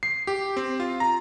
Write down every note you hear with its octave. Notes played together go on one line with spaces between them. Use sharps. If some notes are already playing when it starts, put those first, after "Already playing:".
C7
G4
C4
F4
A#5